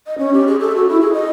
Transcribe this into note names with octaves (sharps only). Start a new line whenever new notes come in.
D#5
C#4
G4
G#4
A4
F#4
E4
G#4
D#5